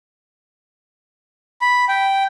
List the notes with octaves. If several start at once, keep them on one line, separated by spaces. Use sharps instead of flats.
B5
G5